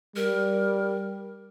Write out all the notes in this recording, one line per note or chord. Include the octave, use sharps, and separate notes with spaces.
G3 A#4